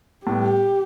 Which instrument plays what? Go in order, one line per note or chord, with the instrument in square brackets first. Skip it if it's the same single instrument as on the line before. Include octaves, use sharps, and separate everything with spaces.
[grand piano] A2 G3 B3 [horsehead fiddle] G4